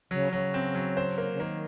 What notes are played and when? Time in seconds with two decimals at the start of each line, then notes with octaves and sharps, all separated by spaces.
0.10 C#3 F#3
0.32 C#3 F#3
0.54 C4
0.75 F#3
0.97 C5
1.18 A#3
1.32 C#3
1.40 D#3 A#3